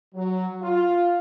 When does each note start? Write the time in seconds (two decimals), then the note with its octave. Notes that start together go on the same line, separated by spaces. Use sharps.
0.14 F#3
0.61 F4